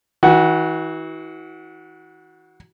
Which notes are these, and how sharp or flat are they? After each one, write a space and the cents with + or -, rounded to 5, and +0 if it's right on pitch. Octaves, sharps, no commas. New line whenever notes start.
E3 -35 F#4 +0